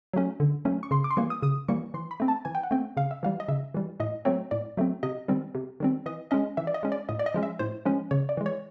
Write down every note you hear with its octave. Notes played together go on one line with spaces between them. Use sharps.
F#3 A3 C#4
D3
F#3 A3 C#4
C#6
C#3 C6
D6
C6
E3 G3 A#3 C#6
D#6
C#3 D#6
E3 G3 A#3 C#6
E3 C6
B5
A3 C4
A5
E3 G#5
G5
F#5
A3 C4 G5
C#3 F5
E5
E3 G3 F5
D#5
C#3 E5
E3 G3
A2 D#5
F#3 A3 C4 C#5
A2 D5
F#3 A3 C4
C3 D#5
D#3 G3 C4
C3
D#3 G3 C4
E3 D#5
G#3 C#4 D#5
E3 E5
D5
D#5
G#3 C#4
D5
A2 D#5
D5
D#5
F3 G#3 C#4
E5
A2 C5
F3 G#3 C#4
C#3 C#5
D5
E3 G#3
C#5